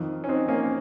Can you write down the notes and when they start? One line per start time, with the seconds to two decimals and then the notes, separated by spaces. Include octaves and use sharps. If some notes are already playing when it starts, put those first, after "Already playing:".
Already playing: F2 D#3
0.24 C#4
0.29 C4 D#4
0.49 A#3 C#4